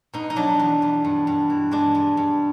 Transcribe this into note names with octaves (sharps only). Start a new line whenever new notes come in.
B2 D#4
D#4
F#3 D4
E2
E2
G2
G2
E3
G#3 D4
G2
G2